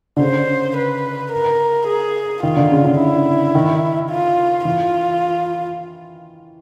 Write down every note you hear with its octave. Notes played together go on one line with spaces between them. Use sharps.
D3
C#3 C5
B4
A#4
G#4
D#3 F4
D3
C#3
D3
E4
D#3
F4
E3 F4